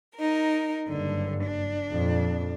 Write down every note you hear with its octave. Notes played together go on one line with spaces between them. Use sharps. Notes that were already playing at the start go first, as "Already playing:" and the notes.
D#4 A#4
F#1 G2 D3
D4
F2 A#2